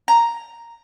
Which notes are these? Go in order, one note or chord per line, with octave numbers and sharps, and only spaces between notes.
A#5